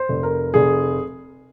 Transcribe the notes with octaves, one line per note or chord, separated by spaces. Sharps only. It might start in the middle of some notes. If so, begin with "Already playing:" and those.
Already playing: C5
F1
A#4
F1 G#4